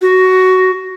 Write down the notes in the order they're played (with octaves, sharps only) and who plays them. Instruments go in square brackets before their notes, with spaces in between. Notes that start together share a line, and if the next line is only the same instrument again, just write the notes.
[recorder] F#4